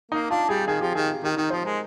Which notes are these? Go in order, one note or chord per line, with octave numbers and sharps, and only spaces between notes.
A#3 D#4
D4 F4
G3 G#4
D#3 G#4
F3 G4
D#3 G#4
G#4
D#3 G4
D#3 D#4
F3 C5
G#3 A#4